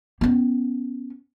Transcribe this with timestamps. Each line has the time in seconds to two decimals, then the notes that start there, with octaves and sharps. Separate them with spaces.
0.21 B3 C#4